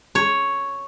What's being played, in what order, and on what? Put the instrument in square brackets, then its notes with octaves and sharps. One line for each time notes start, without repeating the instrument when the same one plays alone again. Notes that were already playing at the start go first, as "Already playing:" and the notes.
[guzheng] C#5